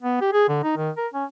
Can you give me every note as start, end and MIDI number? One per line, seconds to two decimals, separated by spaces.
0.01 0.20 59
0.21 0.31 67
0.33 0.44 68
0.48 0.61 50
0.63 0.76 63
0.77 0.90 51
0.97 1.07 70
1.14 1.25 61